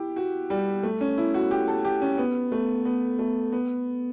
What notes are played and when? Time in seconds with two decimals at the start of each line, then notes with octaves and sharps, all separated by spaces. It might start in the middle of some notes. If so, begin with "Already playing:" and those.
Already playing: E4 G4
0.16 F#4
0.50 G3
0.83 A3
1.01 C#4
1.18 E4
1.34 F#4
1.51 G4
1.68 A4
1.85 G4
2.02 C#4
2.18 B3
2.52 A3
2.85 B3
3.19 A3
3.52 B3